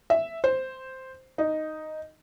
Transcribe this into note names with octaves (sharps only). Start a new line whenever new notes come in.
E5
C5
D#4